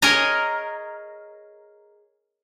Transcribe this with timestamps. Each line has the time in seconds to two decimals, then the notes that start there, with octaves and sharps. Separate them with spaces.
0.02 G#4 A#4 C#5 D#5 G#5 A#5